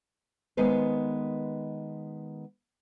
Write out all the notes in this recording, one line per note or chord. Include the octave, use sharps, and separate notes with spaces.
D#3 G#3 B3 B4 C5